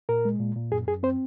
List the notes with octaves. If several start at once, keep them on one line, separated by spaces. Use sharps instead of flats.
A#2 A#4
G#3
A#2
A#2
F#2 G#4
F#2 G#4
C4 C5